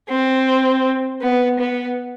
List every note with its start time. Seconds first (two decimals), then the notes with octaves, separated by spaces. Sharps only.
0.09 C4
1.22 B3
1.59 B3